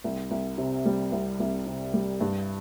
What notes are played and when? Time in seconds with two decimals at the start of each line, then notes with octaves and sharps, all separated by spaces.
0.04 C2
0.31 C2
0.58 C3
0.86 G3
1.12 C2
1.40 C2
1.67 C3
1.94 G3
2.21 G2